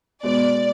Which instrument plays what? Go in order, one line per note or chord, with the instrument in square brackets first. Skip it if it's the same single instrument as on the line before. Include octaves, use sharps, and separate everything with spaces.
[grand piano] B2 G#3 B3 [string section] D5